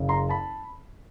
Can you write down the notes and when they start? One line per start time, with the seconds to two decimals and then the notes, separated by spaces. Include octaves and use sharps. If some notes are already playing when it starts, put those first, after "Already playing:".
Already playing: F#1 F#2 C#3
0.09 A#5 C6
0.29 A5 B5